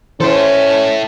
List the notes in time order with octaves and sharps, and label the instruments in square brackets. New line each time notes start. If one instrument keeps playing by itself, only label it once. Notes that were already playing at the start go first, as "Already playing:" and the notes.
[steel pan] E3 C5 [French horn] C#4 [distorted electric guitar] E4 A4